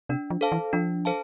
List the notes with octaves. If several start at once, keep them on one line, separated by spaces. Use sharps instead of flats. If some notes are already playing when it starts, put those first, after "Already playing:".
C3 D4
F3
A4 C5 F5 A5
E3
F3 D4
A4 C5 F5 A5